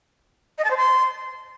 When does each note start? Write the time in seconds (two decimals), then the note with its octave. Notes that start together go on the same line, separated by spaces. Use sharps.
0.58 D#5
0.64 A5
0.71 C5
0.77 C6